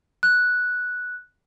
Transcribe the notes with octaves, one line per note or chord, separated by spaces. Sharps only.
F#6